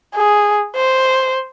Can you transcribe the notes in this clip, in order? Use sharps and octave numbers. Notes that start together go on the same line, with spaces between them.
G#4
C5